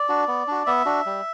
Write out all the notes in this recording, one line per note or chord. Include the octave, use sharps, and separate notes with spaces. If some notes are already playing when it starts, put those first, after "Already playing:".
Already playing: D5
D4 F#4
B3
D4 F#4
B3 E5
D4 F#4
G3